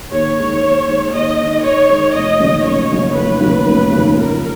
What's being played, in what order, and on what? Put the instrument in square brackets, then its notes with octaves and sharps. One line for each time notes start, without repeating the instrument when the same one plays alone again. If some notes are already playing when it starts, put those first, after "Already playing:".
[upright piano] D#2 [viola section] C#5
[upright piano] D#3 G#3
D#2
D#3 G#3
[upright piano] D#2 [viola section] D#5
[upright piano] D#3 G#3
[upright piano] D#2 [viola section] C#5
[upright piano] D#3 G#3
[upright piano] F1 [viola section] D#5
[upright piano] D#2 C#3 F#3 C#4
[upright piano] F1 [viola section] C#5
[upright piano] D#2 C#3 F#3 C#4
[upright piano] F1 [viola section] B4
[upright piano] D#2 C#3 F#3 C#4
F1
D#2 C#3 F#3 C#4
[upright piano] C#2 [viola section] A#4